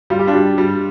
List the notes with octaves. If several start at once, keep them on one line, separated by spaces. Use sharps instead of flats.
G3 F4
G4
D4 F4
G3
G3